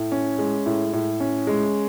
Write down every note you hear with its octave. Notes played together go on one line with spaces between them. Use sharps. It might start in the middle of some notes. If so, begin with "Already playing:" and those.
Already playing: A2
C#4
G#3
A2
A2
C#4
G#3